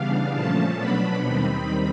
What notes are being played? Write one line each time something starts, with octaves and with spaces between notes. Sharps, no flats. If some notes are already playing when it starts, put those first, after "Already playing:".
Already playing: C#3 E3 G3 B3 D4 F5
A#2 F3 A3 C#4 A5
B2 F#3 B3 D4 B5
D#2 D#3 G3 C4 D#4